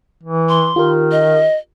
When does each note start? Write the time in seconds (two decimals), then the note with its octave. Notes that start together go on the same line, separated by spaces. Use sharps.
0.23 E3
0.49 C6
0.76 D#3 F4 G4 A#4
1.12 D#5